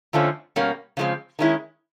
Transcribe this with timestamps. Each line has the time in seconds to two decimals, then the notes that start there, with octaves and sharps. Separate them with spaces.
0.13 F2 D3 F3 A3 C#4
0.56 B2 G3 A#3 C#4
0.97 C#3 F3 G#3 C4
1.39 D#3 G#3 C#4 E4